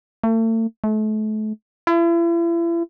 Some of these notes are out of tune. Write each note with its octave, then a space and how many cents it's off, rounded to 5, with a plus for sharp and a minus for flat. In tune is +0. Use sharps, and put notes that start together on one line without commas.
A3 +40
A3 -35
E4 +40